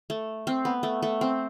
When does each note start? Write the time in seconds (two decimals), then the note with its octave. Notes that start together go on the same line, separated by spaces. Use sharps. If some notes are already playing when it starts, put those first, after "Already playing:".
0.10 A3
0.47 C4
0.65 B3
0.83 A3
1.03 A3
1.21 C4